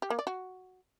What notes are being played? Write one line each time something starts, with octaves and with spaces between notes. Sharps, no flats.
G4
A#3
D5
F#4